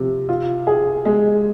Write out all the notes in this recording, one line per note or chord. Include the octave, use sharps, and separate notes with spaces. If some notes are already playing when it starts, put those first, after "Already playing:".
Already playing: C3 F3
F4
G#4
G#3